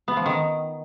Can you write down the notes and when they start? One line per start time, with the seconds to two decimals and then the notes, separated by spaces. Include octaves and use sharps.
0.08 B3
0.17 F3
0.26 D#3